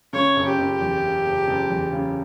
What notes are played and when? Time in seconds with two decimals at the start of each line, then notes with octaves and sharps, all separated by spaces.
0.13 C#3 C#5
0.36 F#1
0.47 G4
0.58 F#1
0.81 E2
1.03 C#3
1.25 F#1
1.47 F#1
1.70 E2
1.92 C#3